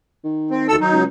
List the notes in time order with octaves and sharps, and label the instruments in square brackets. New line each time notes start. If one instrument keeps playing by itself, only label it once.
[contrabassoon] D#3
[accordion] C4
D2 A4 E6
F#3 D#4
[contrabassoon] C#2